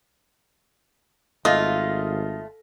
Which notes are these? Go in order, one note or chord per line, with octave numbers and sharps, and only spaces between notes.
G#1 A3 F4 D#5 F5 A#6